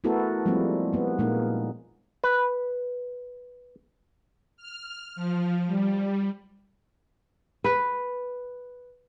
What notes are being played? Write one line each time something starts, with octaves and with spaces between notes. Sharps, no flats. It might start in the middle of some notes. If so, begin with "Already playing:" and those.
A3 B3 E4 F#4 A4 A#4
F3 G3 G#3 A#3 C4 E4
A#3 B3
A#2 G#3 A#3 D#4
B4
F6
F3
G3
B4